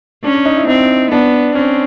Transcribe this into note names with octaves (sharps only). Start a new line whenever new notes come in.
C#4 D4
D4
D#4
E4
C4 D#4
B3 D4
C4 C#4